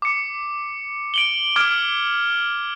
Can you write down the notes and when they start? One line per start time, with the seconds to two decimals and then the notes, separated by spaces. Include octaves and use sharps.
0.02 D6 C#7
1.14 D7 F#7 G7
1.56 D6 F6 G#6 D7